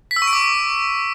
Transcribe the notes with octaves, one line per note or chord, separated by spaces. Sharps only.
B6
E6
C#6
D7
D6